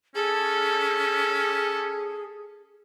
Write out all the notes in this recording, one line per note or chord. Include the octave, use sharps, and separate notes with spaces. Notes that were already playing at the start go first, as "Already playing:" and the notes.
C#4 G#4 A4